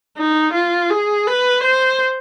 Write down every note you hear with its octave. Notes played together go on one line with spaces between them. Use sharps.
D#4
F4
G#4
B4
C5